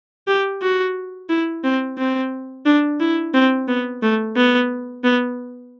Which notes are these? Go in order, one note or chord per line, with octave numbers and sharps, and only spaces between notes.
G4
F#4
E4
C4
C4
D4
E4
C4
B3
A3
B3
B3